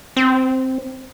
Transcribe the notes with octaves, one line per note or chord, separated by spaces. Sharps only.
C4